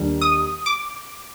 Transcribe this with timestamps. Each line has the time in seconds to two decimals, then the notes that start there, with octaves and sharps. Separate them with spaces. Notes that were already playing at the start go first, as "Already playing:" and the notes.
Already playing: D#2 D#3 G3 D4
0.21 D#6
0.66 D6